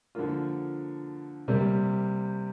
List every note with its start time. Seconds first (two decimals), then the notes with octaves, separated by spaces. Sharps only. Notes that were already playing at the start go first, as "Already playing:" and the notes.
0.15 D3 F3 A#3 F4
1.48 C3 G3 A#3